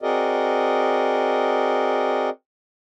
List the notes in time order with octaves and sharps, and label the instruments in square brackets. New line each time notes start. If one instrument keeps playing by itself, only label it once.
[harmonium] C4 F#4 G#4 A#4 D5 D#5